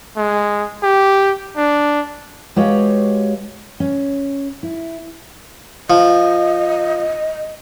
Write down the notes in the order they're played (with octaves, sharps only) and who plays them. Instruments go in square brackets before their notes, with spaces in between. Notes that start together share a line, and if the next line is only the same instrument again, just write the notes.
[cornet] G#3
G4
D4
[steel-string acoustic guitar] G#3 F#4 G4 B4 C#5 F5
C#4
E4
[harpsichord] F3 [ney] D#5